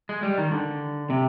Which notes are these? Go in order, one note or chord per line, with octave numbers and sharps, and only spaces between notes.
G#3
G3
D#3
D3
C3